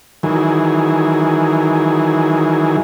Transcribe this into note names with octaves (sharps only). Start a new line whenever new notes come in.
D#3 E3 F#3 G#4